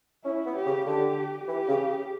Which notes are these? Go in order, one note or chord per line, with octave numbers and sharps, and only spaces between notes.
C#4 E4
B3
G4
C#3
D3 G4
E3 G4
C#3